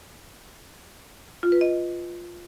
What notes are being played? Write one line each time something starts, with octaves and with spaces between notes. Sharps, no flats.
F4
B4
D#5